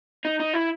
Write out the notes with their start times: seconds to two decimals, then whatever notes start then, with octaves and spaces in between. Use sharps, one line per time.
0.25 D#4
0.40 D#4
0.54 E4